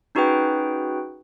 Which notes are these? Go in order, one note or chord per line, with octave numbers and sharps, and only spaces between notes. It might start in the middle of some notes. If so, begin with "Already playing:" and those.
C#4 D#4 F#4 G#4 B4 G5